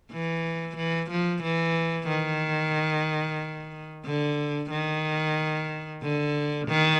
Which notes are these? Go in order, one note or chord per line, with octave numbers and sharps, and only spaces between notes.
E3
E3
F3
E3
D#3
D3
D#3
D3
D#3